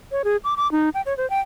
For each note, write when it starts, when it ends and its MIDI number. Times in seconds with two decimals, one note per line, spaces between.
0.12 0.22 73
0.24 0.37 68
0.44 0.55 86
0.57 0.70 86
0.72 0.89 63
0.94 1.01 79
1.06 1.16 73
1.17 1.28 72
1.30 1.40 79